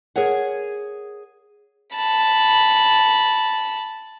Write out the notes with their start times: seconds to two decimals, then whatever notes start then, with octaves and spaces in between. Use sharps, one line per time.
0.16 G#4 A#4 C#5 F#5
1.96 A5 B5